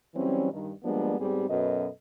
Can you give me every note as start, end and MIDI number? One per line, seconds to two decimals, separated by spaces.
0.15 0.51 52
0.15 0.51 54
0.15 0.51 55
0.15 0.51 60
0.15 0.51 61
0.52 0.71 43
0.52 0.71 51
0.83 1.18 53
0.83 1.18 55
0.83 1.18 56
0.83 1.18 58
0.83 1.18 59
0.83 1.18 62
1.19 1.48 44
1.19 1.48 55
1.19 1.48 59
1.19 1.48 60
1.19 1.48 67
1.19 1.48 68
1.50 1.87 42
1.50 1.87 47
1.50 1.87 69
1.50 1.87 71
1.50 1.87 75